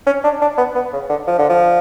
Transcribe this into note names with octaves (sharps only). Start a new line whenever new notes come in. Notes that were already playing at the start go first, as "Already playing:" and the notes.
C#4
D4
D4
B3
B3
C#3
D3
F3
D3
F3